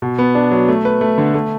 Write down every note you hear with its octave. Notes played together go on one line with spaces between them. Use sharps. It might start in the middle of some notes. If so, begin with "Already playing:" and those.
B2
B3
D4
F#3
A3
B4
A3
D3
A3